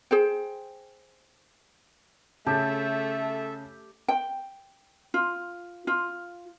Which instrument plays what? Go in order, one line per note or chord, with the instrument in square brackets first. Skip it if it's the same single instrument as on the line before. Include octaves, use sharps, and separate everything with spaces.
[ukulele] G#4 C5 G5
[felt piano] C#3 A5 [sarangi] A3 [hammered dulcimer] G4 [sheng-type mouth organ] A4 E5
[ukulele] G5
F4
F4